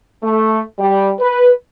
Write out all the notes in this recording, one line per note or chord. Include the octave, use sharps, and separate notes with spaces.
A3
G3
B4